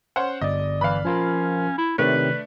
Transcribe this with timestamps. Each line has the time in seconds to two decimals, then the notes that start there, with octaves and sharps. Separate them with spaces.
0.16 C#4 C5 F#5
0.41 G1 D5 D#5
0.81 E3 F5 B5
1.05 F3 C#4 F4 A#4
1.78 E4
1.98 C3 D#3 A3 D4 B4 C#5